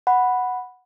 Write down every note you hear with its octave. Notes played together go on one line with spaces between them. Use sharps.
F#5 B5